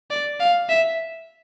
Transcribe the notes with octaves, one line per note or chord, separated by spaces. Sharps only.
D5
F5
E5